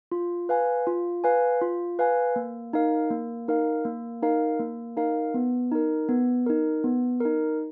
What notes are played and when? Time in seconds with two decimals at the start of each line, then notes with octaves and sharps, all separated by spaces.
0.12 F4
0.49 B4 F5 G#5
0.87 F4
1.24 B4 F5 G#5
1.61 F4
1.99 B4 F5 G#5
2.36 A#3
2.73 D#4 A#4 F5
3.10 A#3
3.48 D#4 A#4 F5
3.85 A#3
4.22 D#4 A#4 F5
4.60 A#3
4.97 D#4 A#4 F5
5.34 B3
5.71 D#4 A#4
6.09 B3
6.46 D#4 A#4
6.84 B3
7.20 D#4 A#4